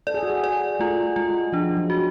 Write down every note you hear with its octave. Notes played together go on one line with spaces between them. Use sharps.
A4 D5
G#4
F#4
G#4
D5
A3 F4
G#3 F4
F3 D4
F#3
F#4